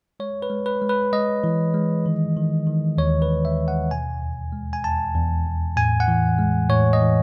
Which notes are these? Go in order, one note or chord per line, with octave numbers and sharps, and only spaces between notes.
G#3 C#5
B4
G#3
B4
G#3
B4
G#3 D#5
E3
G#3
D#3
D#3
D#3
D#2 C#5
B4
D#2
E5
D#2
F#5
B2 G#5
E2
G#3
G#5
E2 A5
E2
E2
A2 G#5
F#5
E3
G#3
A2 C#5
D#5
E3